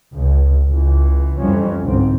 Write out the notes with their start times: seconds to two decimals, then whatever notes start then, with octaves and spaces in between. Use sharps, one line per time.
0.14 C#2
0.69 C#2 E3
1.38 F2 E3 F3 G3 C#4
1.82 G1 C2 G#2 C4